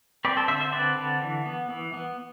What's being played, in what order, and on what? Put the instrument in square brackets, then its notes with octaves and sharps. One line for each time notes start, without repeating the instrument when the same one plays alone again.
[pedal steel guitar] C4 B4 D5
A4 C5
D3 C5 E5
C5 E5
C4 B4 D5
D3
E3
B3
E3
B3